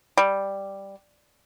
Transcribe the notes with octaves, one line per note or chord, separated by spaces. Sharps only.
G3